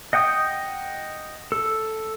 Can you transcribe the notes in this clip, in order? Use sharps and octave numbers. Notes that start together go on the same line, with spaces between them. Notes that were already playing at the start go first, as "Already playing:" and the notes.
D#5 F#5 G5 D#6
A4